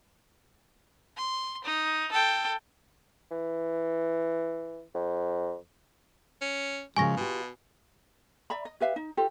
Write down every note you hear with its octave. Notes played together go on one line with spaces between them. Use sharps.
C6
D#4
A4 G5
E3
F2
C#4
F#2 C#3 F3 G#3 G#5 C#6 A#6
B2 F4 G4
D5 E5 A#5 B5
D#5
G4 B4 E5 F5
D#4
F4 G4 A4 C5